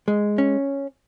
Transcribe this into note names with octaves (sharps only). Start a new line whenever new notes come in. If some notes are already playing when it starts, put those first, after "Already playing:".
G#3
C#4